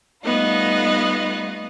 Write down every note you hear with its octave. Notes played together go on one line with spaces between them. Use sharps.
G3 A3 B3 D#4 F4